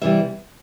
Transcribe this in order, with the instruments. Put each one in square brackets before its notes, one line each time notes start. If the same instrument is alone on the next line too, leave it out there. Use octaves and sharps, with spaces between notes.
[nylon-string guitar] C3 E3 G3 E5